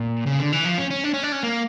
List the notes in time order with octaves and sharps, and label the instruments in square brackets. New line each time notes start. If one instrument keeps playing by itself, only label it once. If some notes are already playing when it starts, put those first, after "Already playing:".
Already playing: [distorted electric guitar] A#2
C#3
D3
E3
F3
C#4
C#4
D4
C#4
D4
C#4
A#3